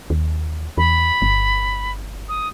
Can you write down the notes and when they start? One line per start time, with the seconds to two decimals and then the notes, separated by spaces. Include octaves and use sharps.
0.10 D#2
0.78 E2 B5
1.22 G1
2.29 D#6